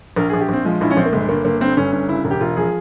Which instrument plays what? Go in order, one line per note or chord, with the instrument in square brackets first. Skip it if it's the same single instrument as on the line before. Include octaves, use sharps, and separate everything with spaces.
[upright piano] A#1 A#4
G#4
A#1
G4
A#1 C4
F3 G#3
A#1 E4
C#4
A#1 C4
A#3
G1 G#3
G1 A#3
G1 A#3
G2 C4
G1 C#4
G2 C#4
C#3 E4
E1
G4
E1 F4
F3 G#4